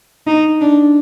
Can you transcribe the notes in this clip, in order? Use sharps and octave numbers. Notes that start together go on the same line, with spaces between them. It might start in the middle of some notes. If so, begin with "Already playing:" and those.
D#4
D4